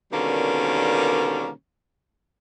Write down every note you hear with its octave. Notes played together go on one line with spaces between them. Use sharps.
B2 D3 D#3 G3 A#3 C#4